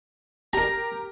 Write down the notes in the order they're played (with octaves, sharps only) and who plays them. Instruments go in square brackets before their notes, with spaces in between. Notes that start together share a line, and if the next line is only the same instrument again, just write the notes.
[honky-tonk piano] G4 A#4 [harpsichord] A#5